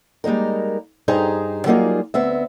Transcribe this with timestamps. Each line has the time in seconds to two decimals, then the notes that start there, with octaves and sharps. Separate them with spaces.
0.24 G3 G#3 A#3 D#4 A#4
1.08 G2 D#4 G4 G#4 C5 A#5
1.66 F#3 G3 A#3 D#4 F4 G#4
2.14 D2 B3 C4 E5